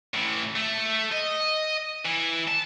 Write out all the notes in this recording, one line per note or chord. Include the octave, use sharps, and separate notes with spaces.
A2 E3
A3
D#5
E3
A5